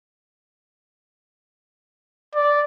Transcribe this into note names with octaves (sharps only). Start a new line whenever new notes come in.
D5